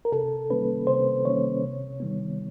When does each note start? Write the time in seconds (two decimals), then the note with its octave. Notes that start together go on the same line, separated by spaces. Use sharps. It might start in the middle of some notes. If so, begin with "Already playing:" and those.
0.05 A#4
0.12 C3 A4
0.50 D#3 G3 A#3 C#4 B4
0.87 C3 C5
1.25 D#3 G3 A#3 C#4 C#5
1.63 C3
2.00 D#3 G3 B3